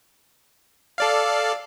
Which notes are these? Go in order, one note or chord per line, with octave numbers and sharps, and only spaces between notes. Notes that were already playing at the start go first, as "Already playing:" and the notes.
A4 D5 F5